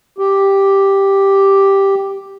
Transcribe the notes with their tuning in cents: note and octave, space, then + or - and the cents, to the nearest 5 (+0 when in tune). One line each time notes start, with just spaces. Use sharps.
G4 +0